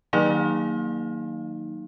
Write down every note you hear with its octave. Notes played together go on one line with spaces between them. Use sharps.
D#3 F#3 A#3 D#4 F5